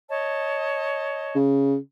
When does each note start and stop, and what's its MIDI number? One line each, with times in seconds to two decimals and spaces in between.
0.09 1.37 73
0.09 1.37 75
0.09 1.37 81
1.35 1.76 49